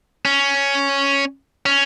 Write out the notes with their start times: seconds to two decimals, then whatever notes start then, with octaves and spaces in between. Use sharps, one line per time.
0.25 C#4
1.66 C#4